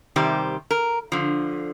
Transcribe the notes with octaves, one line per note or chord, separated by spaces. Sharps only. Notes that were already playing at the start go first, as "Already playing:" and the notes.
C3 D#3 G3 G4 C5
A#4
D3 F3